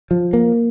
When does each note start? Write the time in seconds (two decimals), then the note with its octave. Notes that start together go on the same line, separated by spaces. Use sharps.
0.11 F3
0.33 A#3